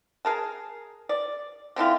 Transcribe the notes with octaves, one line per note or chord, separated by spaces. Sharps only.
G#4 A#4 A5
D5
D3 C4 E4 F4